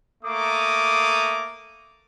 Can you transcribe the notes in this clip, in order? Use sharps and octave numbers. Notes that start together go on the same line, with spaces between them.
A3 A#3 A#5 D6 D#6